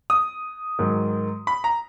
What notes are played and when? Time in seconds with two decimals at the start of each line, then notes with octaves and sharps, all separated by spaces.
0.10 D#6
0.79 G#2 D#3 F#3
1.47 B5
1.64 A#5